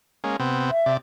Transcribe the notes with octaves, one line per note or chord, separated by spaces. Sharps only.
G#3 A#3 C#4
C3 B3 C4
E5
C3 D5